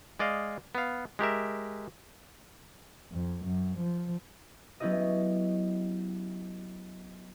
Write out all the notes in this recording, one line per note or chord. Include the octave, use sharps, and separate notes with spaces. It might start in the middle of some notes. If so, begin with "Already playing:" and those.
G#3 D5 D#5 F5
B3 F5
G#3 G4 A#4 E5
F2
F#2
F3
F#3 B3 C#4 E4 G4 D#5